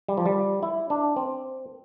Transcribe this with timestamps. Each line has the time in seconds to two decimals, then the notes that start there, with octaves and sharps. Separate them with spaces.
0.08 G3
0.18 F3
0.26 G3
0.63 E4
0.90 D4
1.16 C4